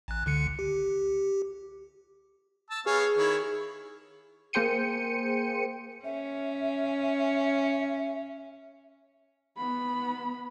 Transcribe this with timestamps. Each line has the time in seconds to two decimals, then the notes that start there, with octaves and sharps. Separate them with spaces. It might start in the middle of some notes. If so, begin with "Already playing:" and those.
0.08 A1 F#6
0.26 C#2 D3 C#7
0.59 G4
2.70 A5 E6
2.86 B3 G#4 C#5 F5
3.17 D#3 E4 C#5
4.53 A#3 G#4 C5 G5 C#7 D#7
6.04 C#4 E5
9.57 B3 B5